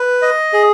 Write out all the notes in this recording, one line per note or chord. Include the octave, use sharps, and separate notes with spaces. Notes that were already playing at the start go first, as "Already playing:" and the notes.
Already playing: B4
D#5
G#4